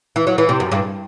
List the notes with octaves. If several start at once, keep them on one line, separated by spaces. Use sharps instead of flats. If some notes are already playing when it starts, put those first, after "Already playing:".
E3
F#3
E3
C3
F#2
G2